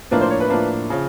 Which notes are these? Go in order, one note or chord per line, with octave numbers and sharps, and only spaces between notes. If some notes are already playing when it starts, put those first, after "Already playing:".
A2 F3 A#3 D4 B4
C5
C#5
B4
A2 F3 A#3 D4
C#3 F3